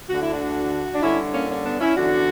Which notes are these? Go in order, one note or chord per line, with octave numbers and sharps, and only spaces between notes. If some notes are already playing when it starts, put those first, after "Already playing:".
D2 D3 F#4
E4
D4 F#4
D4
G2 D3 C#4 E4
A#3 C#4
A#3 C#4
B3 D4
C#4 E4
E2 D3 D4 F#4